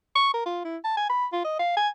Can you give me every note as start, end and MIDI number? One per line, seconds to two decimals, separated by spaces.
0.15 0.30 85
0.34 0.44 70
0.46 0.63 65
0.65 0.77 64
0.84 0.95 81
0.97 1.06 80
1.10 1.26 83
1.33 1.43 65
1.45 1.57 75
1.59 1.72 77
1.77 1.88 80